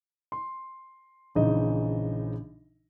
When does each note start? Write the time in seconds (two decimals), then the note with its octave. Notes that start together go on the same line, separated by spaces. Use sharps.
0.32 C6
1.35 A#1 C#3 E3 D#4 D#5